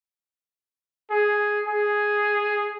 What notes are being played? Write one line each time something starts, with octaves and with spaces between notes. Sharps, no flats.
G#4
G#4